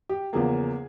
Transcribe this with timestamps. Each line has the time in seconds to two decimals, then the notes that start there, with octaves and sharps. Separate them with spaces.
0.09 G4
0.33 E2 C#3 F3 A#3 G#4